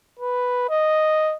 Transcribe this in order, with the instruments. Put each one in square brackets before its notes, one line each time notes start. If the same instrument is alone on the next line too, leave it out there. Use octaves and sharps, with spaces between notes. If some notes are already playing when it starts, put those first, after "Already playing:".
[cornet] B4
D#5